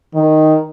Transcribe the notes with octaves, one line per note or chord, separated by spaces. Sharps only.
D#3